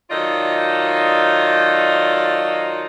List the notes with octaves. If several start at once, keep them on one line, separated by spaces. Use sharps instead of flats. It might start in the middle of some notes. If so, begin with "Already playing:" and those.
D#3 F#3 F4 A4 D5 D#5